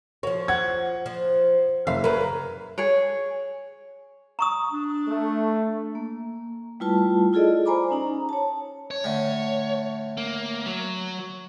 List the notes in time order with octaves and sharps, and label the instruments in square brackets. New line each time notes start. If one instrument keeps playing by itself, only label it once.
[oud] F3 F#4 [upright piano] C#5
[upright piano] F#5 G#6
[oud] F3
[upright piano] F#1 E5 [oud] F5
[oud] C#3 F#3 [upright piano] A#4 B4
[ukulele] G#4 C#5
[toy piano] A#5 C#6 D#6
[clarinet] D4
[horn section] A3
[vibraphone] A#3
G3 A3 E4 F4 B4 A5
E4 F4 G#4 A4 D5 D#5
C5 D5 G#5 A#5 B5 D6
C#4 D#4 A#5
C#5 A5
[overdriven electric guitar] C#5
[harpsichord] A2 D3
[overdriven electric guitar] A#3
F#3